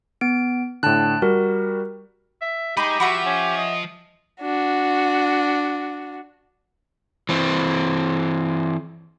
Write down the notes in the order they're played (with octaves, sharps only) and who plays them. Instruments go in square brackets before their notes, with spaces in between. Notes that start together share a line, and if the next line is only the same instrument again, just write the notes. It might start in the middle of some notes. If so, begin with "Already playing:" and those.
[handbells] B3 D7
[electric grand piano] A2 D3 [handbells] G5 A5 F#6
[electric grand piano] G3 F#4 [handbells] A#4
[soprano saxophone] E5
[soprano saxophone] D#4 [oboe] G4 [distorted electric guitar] G#4 D#5 [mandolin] B5
[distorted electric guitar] F3 [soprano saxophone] F#4 [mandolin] E5 F#5 B5
[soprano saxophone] C#4
[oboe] D#5
[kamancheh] D4 F#4
[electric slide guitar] E3 C4